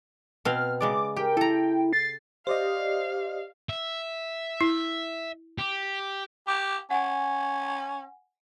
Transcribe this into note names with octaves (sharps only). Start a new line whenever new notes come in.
B2 C4 F5 F6
C#3 G#3 D5 D6
G4 A#4 G5
E4 A4 A#5
A6 C7
G4 C5 D5 D#5 F5
E5
E4
G4
G4 D6
C#4 F#5 G#5